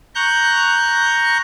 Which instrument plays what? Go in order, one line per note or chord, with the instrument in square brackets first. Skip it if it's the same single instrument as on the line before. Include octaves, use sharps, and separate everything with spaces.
[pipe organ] A#5 C#6 F#6 G6